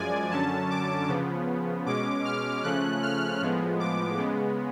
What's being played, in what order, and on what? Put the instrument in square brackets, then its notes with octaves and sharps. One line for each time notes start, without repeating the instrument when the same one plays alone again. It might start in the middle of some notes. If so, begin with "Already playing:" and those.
Already playing: [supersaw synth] F#2 F3 G#3 D5 G#5
F#2 D3 F#3 C#4 A5
D6
C#3 F3 B3
B2 G#3 C#4 D6
F6
C#3 F3 A3 C#4 F#6
F6
A2 F3 G#3 B3
D6
C#3 G#3 B3